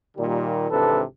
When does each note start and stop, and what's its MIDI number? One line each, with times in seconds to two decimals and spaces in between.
0.17 0.69 46
0.17 0.69 51
0.17 0.69 55
0.70 1.02 32
0.70 1.02 48
0.70 1.02 52
0.70 1.02 62
0.70 1.02 69
0.70 1.02 71